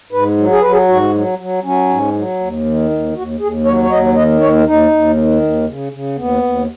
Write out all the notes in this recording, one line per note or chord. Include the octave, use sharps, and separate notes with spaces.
G#2 B4
F#3
G#4
F#3 B4
G#4
G#2 F#4
F#3
F#3
F#3 C#4
G#2
F#3
D#2
D#3
D#2
D#2 F#4
D#2 G#4
F#3 C#5
C#5
D#2 D#5
D#3 D#5
D#2 C#5
D#2 D#4
D#2
D#3
D#2
C#3
C#3
D#2 B3
D#2